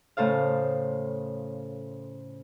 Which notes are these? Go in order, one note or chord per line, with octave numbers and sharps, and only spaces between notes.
A2 C#3 A4 C5 F5